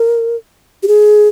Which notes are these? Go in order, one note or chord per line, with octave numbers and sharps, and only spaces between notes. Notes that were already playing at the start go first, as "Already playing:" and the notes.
Already playing: A#4
G4
G#4